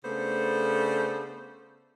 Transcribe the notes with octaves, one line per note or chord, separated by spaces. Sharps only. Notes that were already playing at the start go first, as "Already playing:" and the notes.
C#3 A3 B3 D4 A4 C5